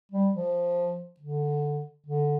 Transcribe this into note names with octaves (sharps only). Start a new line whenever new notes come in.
G3
F3
D3
D3